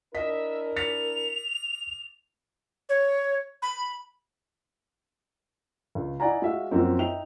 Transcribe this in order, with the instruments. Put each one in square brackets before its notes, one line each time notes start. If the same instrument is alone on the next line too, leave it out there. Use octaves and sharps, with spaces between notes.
[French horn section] D4 E4 A#4 [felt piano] D#5 B6 [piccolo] E5
[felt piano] A6 B6 C#7 [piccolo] F7
[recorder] C#5
B5
[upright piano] C#2
D#4 E4 D5 F#5 G#5 A#5
G#3 F#4 E5 F5
F#2 F3 F#3 A#3 C4
D#4 E5 G5 F7